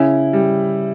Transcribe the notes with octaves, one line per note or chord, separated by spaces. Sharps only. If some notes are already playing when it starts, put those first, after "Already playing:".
Already playing: C#3 E4
G3